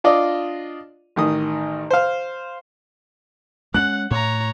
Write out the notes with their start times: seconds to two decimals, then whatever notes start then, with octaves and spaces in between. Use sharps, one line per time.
0.04 D4 F4 D5 D#5
1.16 A1 D#3 D#6
1.91 C5 F5
3.74 G#3 C4 C#4 F#5 F#6 F#7
4.11 A2 C#5 A#5